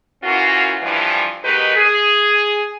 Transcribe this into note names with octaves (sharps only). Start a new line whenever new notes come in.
E3 A#3 C#4 F4 F#4
G2 E3 F3
F#3 G#3 D#4 G4 A#4 B4
G#4